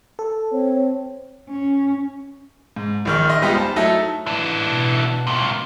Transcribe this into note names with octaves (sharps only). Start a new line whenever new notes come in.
A4
C4 C#5
C#4
G#2
A#1 D#3 F6
D#5 E5 C6
G3 G#3 B3 D#4 F4 G4
C5 A5
F#3 A3 D#4 E4 A4 E5
E3 D4
B2
C#2 A#2